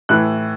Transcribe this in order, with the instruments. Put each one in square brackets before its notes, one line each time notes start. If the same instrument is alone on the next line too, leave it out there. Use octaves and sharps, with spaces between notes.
[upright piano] A2 E3 F#6